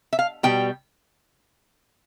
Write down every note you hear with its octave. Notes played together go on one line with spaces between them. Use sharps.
E5
F5
B2 G3 G5